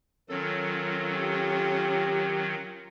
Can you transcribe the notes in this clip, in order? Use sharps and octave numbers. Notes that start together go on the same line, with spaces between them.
D#3 F#3 C#4 F4 A4
G4